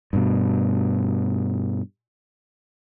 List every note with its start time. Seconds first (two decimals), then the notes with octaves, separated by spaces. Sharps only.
0.13 G2 B2